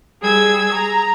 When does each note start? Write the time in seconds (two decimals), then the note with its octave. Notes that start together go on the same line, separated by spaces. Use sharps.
0.20 G3 G#4 E6 G#6
0.75 A#5